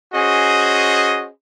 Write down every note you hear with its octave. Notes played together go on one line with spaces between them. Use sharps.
C#4 F#4 G#4 C5 D#5